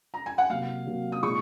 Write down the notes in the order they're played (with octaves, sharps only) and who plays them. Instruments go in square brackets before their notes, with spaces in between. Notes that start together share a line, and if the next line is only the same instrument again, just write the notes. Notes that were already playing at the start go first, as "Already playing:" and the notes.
[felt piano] A#5
G#5
F#5
[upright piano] C3 F#3 A#3 [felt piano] F5
[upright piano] C3 F#3 A#3
[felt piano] D#6
[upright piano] A#2 G#3 D#4 G#4 [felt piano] C#6